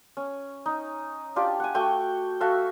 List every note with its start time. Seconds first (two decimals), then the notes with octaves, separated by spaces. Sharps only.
0.17 C#4
0.66 D#4
1.36 D4 F4 G4 D5
1.60 F#5 G#5
1.75 A3 F#4 G5 C#6
2.40 F#4 A4 E5 F5